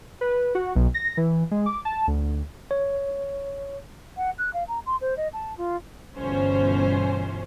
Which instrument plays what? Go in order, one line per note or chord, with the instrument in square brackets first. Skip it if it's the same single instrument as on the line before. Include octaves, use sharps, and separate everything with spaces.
[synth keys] B4
F#4
B1
A#6
E3
G#3
D6
A5
D2
[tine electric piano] C#5
[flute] F#5
F#6
F5
A#5
C6
C5
D#5
A5
F4
[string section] G1 B2 E3 C#4 C5